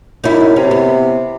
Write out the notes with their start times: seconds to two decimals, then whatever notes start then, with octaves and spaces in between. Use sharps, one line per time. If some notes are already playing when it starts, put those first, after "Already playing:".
0.24 F#2 D#4 E4
0.56 C3 C#4
0.71 B3